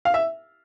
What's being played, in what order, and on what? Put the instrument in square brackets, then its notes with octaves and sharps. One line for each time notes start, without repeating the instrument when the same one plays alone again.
[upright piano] F5
E5